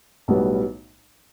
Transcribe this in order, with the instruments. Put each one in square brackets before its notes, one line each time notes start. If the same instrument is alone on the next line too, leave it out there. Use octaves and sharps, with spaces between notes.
[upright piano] B1 A2 G3 B3 F#4